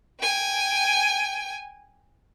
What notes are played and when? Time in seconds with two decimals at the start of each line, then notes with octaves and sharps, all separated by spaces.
0.21 G5 G#5